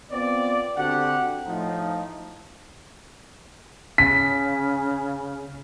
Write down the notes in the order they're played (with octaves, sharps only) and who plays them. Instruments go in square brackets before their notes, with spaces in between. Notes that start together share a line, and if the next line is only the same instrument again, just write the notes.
[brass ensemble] B3 C4 F4 D5
D3 C4 F#4 G4 F#5
A2 F3 D#4
[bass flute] C#3 [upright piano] B6